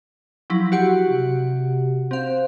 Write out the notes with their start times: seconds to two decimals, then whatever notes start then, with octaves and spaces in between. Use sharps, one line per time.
0.50 F3 F#3 E4
0.72 F#4 G4 F#5
1.07 C3
2.11 C4 C5 F5